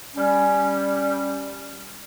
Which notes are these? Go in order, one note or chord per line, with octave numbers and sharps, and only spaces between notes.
G3 C#4